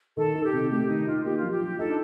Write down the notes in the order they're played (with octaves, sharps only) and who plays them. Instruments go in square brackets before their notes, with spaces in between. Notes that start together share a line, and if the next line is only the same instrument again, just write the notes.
[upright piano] D#3 [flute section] A4
[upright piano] D#4
[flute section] G4
[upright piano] C3
[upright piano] A3 [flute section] G4
[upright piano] D#3 [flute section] D#4
[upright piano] D#4 [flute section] F4
[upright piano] A#3 [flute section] G4
[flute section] F4
[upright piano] F3
[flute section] G4
[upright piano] F3
[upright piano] D#4 [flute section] A4
[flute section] D4